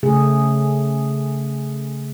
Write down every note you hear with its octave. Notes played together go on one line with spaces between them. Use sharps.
C#3 A3 G#4